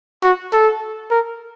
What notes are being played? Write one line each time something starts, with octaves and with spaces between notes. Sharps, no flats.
F#4
A4
A#4